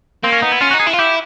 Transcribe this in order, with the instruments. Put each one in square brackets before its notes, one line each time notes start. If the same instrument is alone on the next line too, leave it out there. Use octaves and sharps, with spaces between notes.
[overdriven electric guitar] A#3 [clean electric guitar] C4
[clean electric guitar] C#4
[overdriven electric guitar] B3 [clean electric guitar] D#4
[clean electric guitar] E4
[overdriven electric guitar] C#4 [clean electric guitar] F4
[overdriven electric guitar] D#4 [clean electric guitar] F#4
[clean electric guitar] G#4
[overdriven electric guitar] E4
F4
[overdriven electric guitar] E4 [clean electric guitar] G4